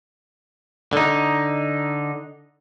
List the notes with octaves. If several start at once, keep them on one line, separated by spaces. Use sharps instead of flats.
D3 D#4